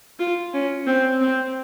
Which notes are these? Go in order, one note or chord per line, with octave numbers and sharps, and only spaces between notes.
F4
C#4
C4
C4